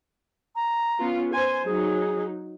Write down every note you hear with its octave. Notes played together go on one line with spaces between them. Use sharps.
A#5
B3 C#4 F4
C5 G#5 C6
F#3 D#4 G#4